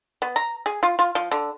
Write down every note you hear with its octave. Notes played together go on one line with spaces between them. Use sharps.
B3
A#5
G#4
F4
F4
F3
D3